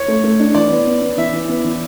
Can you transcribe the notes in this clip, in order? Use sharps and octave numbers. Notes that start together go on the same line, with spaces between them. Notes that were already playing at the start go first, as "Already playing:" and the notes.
Already playing: C#5
A3
A3
D4
E3 D5
B3
B3
B3
E3 E5
E3
B3
E3